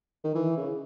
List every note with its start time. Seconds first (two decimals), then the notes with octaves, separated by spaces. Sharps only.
0.24 D#3
0.35 E3
0.57 C#3